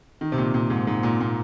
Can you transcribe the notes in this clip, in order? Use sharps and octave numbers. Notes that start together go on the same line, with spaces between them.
D#3
C3
A#2
A#2
G#2
G#2
A#2
A#2